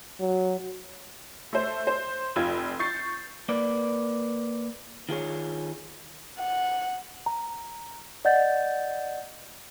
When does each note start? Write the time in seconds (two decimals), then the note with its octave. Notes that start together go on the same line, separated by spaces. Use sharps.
0.20 F#3
1.53 A3 C5
1.87 C5
2.36 F1 F4 G#6
2.79 C#6 G6 A6 C7
3.49 A#3 B4 D5
5.09 D#3 F4 G#4 C#5
6.39 F#5
7.26 A#5
8.25 D5 D#5 F#5 G6 A6